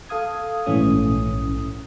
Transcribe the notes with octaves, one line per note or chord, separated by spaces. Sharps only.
A4 F5 D#6 G#6
A#1 G#2 E3 A3 C#4 D#6